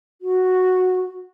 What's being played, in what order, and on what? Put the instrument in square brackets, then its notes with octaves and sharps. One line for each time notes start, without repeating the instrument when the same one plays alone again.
[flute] F#4